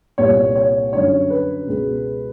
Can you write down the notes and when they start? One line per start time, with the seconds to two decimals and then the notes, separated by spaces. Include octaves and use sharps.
0.18 C2 A#2 G3 B3 C#5
0.55 C#5
0.92 F#2 D3 G3 C#5
1.30 B4
1.67 C#2 B2 G#3 B3